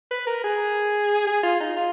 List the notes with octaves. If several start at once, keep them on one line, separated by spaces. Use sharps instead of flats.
B4
A#4
G#4
G#4
F4
D#4
F4